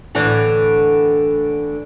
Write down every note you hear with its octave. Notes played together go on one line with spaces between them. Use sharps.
A2 D3 E3